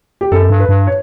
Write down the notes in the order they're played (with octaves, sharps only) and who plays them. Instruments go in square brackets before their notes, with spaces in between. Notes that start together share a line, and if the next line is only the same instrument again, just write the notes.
[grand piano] G4
[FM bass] F#2 [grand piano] A4
[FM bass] G2
[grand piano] B4
[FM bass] G2
[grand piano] C#5